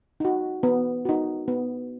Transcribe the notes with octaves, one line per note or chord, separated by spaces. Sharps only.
D#4 F#4
B3
D#4 F#4
B3